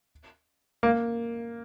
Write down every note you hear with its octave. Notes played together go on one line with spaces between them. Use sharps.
A#3